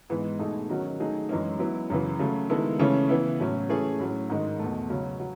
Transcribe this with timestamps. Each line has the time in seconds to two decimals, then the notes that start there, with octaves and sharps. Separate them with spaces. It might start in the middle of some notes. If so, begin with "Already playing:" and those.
0.10 G#2 E3 G#3 B3
0.39 B2 A3 D#4 G#4
0.69 D#3 F#3 C#4 F#4
1.00 F#3 A3 D#4 G#4
1.29 F#2 E3 G#3 C#4
1.59 F#3 B3 E4
1.90 F#2 C#3 E3
2.19 C#3 F#3 A3
2.49 D#3 G#3 B3 E4 A4
2.79 C#3 E3 A3 C#4
3.09 E3 B3 E4
3.40 A2 F#3 C#4
3.69 E3 A3 C#4 G#4
3.99 A2 F#3 C#4
4.30 G#2 D#3 G#3
4.59 E2 B2 A3
4.90 C#3 F#3 C#4
5.20 F#3